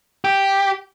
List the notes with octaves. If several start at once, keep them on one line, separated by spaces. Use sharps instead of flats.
G4